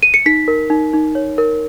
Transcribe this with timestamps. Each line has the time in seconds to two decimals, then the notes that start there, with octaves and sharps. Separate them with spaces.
0.03 D#7
0.14 C#7
0.26 D#4 B6
0.48 A#4
0.70 D#4
0.93 D#4
1.15 C#5
1.38 A#4